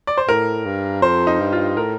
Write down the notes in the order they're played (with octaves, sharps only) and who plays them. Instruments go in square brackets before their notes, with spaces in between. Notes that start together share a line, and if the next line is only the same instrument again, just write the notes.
[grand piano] D5
C5
[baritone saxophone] A2 [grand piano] A#4
[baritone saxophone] G2
[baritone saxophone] F2 [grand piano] C5
[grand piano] D#4
[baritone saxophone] G2
[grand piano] F4
[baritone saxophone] A2 [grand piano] A#4